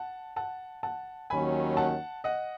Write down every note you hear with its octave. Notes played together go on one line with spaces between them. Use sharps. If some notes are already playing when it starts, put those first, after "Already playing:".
Already playing: F#5 A5
F#5 A5
F#5 A5
D#2 D#3 F#3 C#4 G#5 B5
F#5 A5
D#5 F#5